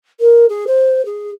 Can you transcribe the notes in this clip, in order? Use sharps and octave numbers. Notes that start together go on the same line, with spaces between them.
A#4
G#4
C5
G#4